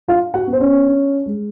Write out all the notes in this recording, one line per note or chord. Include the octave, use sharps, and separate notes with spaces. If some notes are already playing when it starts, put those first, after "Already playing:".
D4 F4 F5
F#4 F#5
B3
C5
C#4 C#5
D4
G#3